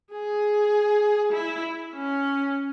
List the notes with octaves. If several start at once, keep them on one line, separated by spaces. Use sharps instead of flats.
G#4
E4
C#4